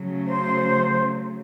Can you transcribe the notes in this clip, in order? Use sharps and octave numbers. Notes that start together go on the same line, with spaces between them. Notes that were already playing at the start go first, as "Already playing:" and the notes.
Already playing: C#3 F#3 A3
C5